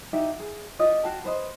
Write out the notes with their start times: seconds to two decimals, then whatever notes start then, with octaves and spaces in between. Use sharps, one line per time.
0.13 D#4 F#4 G4 E5
0.39 G#4
0.79 F4 G4 D5 D#5
1.03 F#4 F5 G5 A5
1.24 B4 C5 D#5